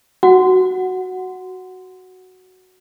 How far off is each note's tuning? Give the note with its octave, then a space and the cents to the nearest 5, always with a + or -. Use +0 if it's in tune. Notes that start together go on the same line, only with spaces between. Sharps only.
F#4 +0 F#5 +0